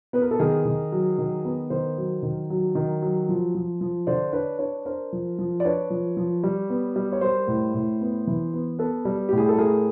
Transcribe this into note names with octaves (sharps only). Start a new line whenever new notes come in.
B3 B4
A#4
A4
D#3 G#4 A#4
D#3
F#3
D#3
B3
D#3 A#4 C5
F#3
D#3
F#3
D#3
F#3
F3
F3
F3
D3 C5 D5
D4 B4 C#5
D4 B4 C#5
D4 A#4 C5
F3
F3
D5
D4 B4 C#5
F3
F3
G3
B3
G3
C#5
G3 A#4 C5
A2
A2
B3
E3
B3
B3 A4 B4
G3
A2 G4
G#4
A4
A3 G#4 A#4